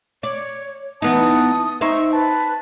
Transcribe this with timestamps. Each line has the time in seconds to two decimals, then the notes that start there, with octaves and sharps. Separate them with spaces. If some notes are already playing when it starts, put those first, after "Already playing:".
0.23 C#5 D5
1.02 E3 B3 D#4 A5 D#6
1.81 C4 D#4 E5 C#6
2.13 B4 A5